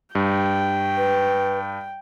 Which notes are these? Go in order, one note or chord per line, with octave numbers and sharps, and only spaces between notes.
G2 G5
B4